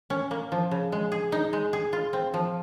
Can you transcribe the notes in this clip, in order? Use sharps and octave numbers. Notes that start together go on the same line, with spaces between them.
C#4
A#3
F3
C#3
G#3
G#4
D#4
G#3
G#4
F4
C4
F3